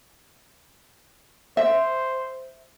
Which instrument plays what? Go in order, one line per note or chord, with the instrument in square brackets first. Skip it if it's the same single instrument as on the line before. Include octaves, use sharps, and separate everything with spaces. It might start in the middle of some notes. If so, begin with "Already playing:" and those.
[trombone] C5 [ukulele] E5